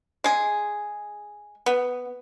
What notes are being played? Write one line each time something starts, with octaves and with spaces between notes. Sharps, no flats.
G#3 G#4
B3